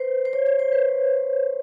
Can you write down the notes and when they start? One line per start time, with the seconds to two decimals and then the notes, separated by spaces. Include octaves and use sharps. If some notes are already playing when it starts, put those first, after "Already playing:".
Already playing: B4 C5
0.25 C5
0.33 C#5
0.46 C#5
0.59 C5
0.72 B4